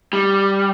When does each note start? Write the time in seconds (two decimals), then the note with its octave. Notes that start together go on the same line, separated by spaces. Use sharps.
0.13 G3